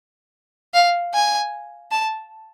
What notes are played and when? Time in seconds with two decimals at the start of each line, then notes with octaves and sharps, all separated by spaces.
0.74 F5
1.14 G#5
1.91 A5